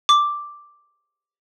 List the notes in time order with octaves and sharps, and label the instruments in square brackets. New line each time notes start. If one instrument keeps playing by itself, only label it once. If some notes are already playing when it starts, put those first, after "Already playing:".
[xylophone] D6